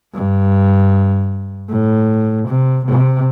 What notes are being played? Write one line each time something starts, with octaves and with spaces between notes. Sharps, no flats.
G2
A2
C3
C3